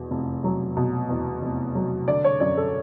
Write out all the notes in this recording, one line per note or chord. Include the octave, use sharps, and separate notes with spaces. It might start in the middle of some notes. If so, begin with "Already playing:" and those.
Already playing: E2 B2
F1
F#3
B2
E2
F1
F#3
D3 D5
C#5
F#2 D5
A4